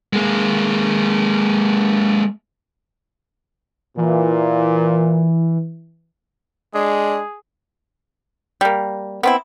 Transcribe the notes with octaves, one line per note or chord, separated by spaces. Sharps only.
G#3 A#3
A#2 E3
G#3 D4 G#4
G3 A#3
B3 C4 E4